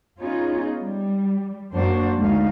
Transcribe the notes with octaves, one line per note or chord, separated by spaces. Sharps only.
B3 C#4 D#4 F4 G#4 C#5
G3
F#2 A#3 D4 F#4 C5
D2 G#3 A3 D#4 F5